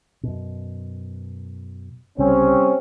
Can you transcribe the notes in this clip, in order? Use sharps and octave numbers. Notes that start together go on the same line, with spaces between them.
F#2 B2
C2 C#3 G3 C4 C#4